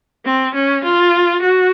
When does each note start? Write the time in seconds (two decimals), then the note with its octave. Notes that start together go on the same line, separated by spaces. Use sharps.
0.25 C4
0.54 C#4
0.84 F4
1.42 F#4